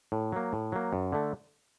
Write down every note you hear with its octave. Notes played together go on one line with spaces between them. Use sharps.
A2
F#3 A#3
A2
F#3 A#3
F#2
D3 A3